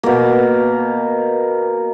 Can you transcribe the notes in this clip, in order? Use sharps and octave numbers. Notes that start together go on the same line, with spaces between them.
B2 A#3